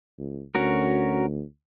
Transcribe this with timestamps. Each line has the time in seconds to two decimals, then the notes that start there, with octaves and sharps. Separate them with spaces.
0.18 C#2
0.55 D2 C#4 F#4 A#4